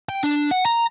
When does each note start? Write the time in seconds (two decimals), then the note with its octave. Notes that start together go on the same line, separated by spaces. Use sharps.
0.09 G5
0.23 D4
0.51 F#5
0.66 A#5